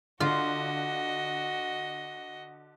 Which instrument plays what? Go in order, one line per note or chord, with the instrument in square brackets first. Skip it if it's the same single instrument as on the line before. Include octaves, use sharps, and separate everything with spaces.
[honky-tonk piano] D3 [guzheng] F4 [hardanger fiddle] F#4 D#5